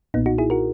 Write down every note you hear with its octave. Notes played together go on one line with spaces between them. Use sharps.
B1 A#2 B3 D#4
D#4 F#4
E4 G#4
F#4 A#4